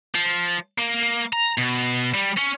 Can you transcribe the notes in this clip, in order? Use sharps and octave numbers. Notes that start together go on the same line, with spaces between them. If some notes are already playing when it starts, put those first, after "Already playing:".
F3
A#3
A#5
B2
G3
C#4